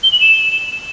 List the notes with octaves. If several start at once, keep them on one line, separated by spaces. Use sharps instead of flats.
G7
F#7
E7